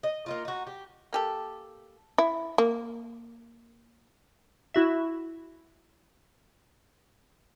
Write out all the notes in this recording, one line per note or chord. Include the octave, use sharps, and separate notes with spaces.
D#5
A#3 D#4 F4
D#4 F#4
G4
A#3 G4 A4
E4
A#3
E4 F#4 E5